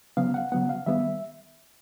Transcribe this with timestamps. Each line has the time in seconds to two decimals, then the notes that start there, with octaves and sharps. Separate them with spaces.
0.17 C#3 F#3 B3 F5
0.34 F#5
0.52 C#3 F#3 B3 F#5
0.69 F5
0.86 D#3 G3 B3 E5